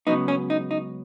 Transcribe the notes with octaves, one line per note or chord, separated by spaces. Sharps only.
C#2 C#3 F#3 B3 D#4
C#4
D#4
D#4